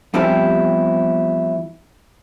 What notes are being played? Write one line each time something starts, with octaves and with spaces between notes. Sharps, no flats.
E2 F3 G3 C4 E4 G4